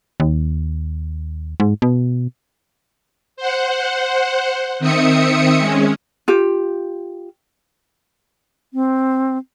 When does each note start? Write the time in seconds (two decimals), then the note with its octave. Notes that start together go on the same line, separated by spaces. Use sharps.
0.20 D#2
1.60 G#2
1.82 B2
3.37 C5 F#5
4.79 D#3 C4 E5 D#6 C#7
5.59 G#3 C#4
6.28 F4 G4
8.74 C4